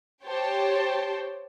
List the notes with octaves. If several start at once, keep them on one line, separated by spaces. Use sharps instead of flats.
G4 C5 C#5 G5 A5